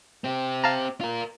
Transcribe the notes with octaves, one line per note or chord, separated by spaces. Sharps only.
C4 G4
F5 A5 A#5
F4 A#4